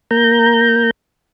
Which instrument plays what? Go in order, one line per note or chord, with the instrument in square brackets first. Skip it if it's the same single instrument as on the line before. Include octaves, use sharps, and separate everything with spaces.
[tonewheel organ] A#3 A#5 G6